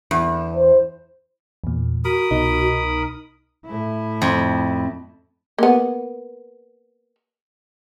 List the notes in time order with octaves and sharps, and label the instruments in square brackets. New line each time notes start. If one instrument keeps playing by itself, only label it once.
[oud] E2
[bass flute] C5
[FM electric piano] E2 A#2
[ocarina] F#4 [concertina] A#4 B5 D#6
[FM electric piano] C2 B2 D#4
[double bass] A2 E4
[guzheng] F2
[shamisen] A#3 B3